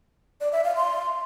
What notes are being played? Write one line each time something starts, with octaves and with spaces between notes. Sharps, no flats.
D5
E5
F5
C6